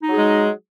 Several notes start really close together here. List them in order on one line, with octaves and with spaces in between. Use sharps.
D#4 F#3 G#4 G#3